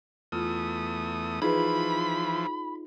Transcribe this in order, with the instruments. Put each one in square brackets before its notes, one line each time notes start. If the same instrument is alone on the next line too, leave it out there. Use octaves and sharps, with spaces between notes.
[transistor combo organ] E2 A3 D#6 [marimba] F4
[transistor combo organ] E3 F3 [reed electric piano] D#4 F4 [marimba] G#4 B4 [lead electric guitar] B5